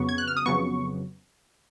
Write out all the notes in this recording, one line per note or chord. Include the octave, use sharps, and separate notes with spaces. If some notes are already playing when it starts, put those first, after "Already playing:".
Already playing: F2 C#3 F#3 B3 C#6
G#6
F#6
F6
D#6
F2 C#3 F#3 B3 C#6